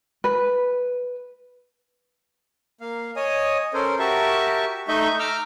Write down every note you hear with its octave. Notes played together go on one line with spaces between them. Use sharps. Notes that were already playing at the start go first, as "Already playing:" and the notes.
B4
A#3 F5
C#5 D#5 G#5 D#6
C#4 A4 A#4 C5
F#4 G4 A#4 E5 A5 C#6
A3 D#4 D#5 E5 C#6 G6
A#5 D6 E6 F6